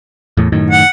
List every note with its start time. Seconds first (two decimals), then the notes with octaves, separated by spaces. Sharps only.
0.37 E2 A2
0.52 F#2 A2 D#3
0.70 F#5